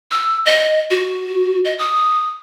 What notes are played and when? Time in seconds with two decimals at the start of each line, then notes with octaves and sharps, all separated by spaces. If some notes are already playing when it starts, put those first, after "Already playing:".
0.11 E6
0.46 D#5
0.90 F#4
1.65 D#5
1.79 D#6